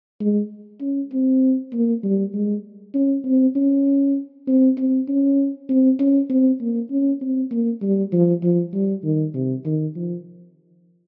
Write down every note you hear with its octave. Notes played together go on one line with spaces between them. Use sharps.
G#3
C#4
C4
A#3
G3
G#3
C#4
C4
C#4
C4
C4
C#4
C4
C#4
C4
A#3
C#4
C4
A#3
G3
F3
F3
G3
D#3
C3
D#3
F3